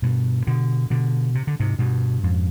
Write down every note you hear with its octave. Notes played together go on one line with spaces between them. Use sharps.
G2 B2
B2 D3
B2 D3
C3
D3
G#2 C3
G2 B2
F2 G#2